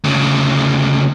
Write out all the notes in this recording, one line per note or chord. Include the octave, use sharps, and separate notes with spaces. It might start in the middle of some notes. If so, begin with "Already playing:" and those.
D2 C#3